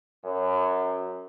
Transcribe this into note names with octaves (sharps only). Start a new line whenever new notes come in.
F#2